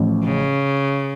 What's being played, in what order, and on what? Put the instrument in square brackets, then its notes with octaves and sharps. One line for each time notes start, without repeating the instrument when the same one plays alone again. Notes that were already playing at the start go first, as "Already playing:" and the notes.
Already playing: [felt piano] A1 A2 F3
[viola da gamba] C#3